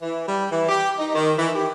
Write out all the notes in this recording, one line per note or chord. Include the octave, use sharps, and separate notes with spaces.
E3
G3
E3
G4
D#4
D#3
E3
G4